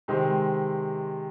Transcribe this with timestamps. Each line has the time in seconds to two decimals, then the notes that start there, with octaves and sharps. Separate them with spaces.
0.08 C3 D#3 G#3 C4